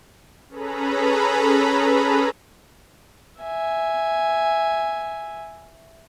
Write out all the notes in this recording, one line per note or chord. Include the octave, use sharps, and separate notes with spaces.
C#4 G#4 A4 B4 A#5 B5
E5 G#5